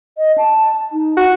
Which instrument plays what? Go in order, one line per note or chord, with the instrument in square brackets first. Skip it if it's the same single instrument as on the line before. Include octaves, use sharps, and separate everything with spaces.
[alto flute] D#5
A5
D#4
[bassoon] F#4